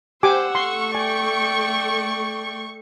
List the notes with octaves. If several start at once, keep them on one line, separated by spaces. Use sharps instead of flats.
G4 C5 F#5 G#5 D6 E6
A3 C6 C#6
D5 G5 G#5